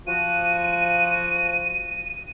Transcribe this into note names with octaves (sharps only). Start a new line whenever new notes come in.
F3 F#4 D#7